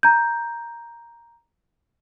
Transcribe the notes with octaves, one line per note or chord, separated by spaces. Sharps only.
A#5 G6